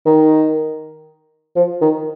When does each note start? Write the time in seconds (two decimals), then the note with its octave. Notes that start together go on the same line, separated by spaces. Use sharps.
0.05 D#3
1.56 F3
1.81 D#3